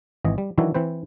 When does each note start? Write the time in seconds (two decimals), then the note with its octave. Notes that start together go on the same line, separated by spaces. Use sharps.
0.25 G#1 E3 D#5
0.38 G3
0.58 D#3 E3 F#3 D4 E4 F#4
0.75 E3 C4 B4 C5